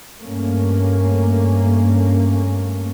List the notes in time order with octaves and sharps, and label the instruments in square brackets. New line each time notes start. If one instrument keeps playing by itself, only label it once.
[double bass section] G2 A3 A#3 C#4